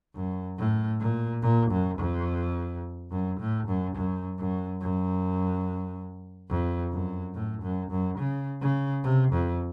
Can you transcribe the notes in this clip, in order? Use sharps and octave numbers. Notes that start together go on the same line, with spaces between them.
F#2
A2
A#2
A#2
F#2
F2
F#2
A2
F#2
F#2
F#2
F#2
F2
F#2
A2
F#2
F#2
C#3
C#3
C3
F2